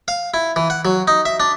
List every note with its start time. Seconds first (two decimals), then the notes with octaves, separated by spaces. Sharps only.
0.08 F5
0.34 E4
0.56 E3
0.70 F#5
0.85 F#3
1.08 D#4
1.26 E5
1.40 D4